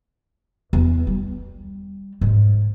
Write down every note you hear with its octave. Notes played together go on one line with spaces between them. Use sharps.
E2
G3
G#2